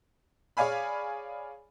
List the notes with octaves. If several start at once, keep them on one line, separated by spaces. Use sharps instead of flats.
G#4 C#5 D5 F5 G#5 B5